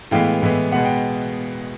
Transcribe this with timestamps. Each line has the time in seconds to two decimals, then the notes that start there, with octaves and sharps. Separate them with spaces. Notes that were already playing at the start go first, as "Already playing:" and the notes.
0.11 A2 E3 G#3 B3 F5 G5
0.42 A2 E3 G#3 B3
0.72 B2 G#3 B3 F#5
0.85 G5